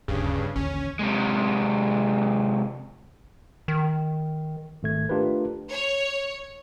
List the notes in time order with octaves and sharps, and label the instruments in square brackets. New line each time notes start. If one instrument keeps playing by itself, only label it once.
[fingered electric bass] D#1 D2 [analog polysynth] G2 C#3
[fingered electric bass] A1 D#2 D3 [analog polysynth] C#4
[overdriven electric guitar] C3 G#3
[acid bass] D#3
[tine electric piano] G#1 A3 G#6
A3 D4 F4 G4 A#4 B4
[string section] C#5